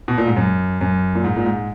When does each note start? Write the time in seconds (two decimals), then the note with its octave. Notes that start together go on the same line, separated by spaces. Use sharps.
0.08 B2
0.18 A#2
0.27 G#2
0.37 F#2
0.81 F#2
1.15 A#2
1.24 G#2
1.36 A#2
1.46 G#2